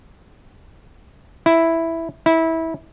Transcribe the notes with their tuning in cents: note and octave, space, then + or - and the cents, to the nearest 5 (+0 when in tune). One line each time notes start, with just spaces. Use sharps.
E4 +0
E4 -20